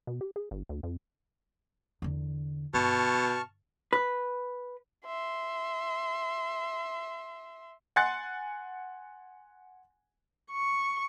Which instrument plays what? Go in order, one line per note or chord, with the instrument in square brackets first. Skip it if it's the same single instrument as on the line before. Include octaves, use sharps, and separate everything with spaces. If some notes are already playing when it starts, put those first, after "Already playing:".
[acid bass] B2
G4
G#4
G1
D2
F2
[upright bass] E2 D3
[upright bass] G1 [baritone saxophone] B2 [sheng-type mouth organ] A5 C#6 F6
[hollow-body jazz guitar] B4
[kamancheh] E5 C6
[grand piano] F#5 G#5 C6 F#6 A6 C#7
[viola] C#6